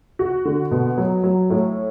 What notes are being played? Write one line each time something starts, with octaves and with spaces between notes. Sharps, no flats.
F#4
D3
B2
F#3
F#3
A2